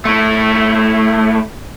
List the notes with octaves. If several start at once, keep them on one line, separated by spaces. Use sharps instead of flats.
A3 E4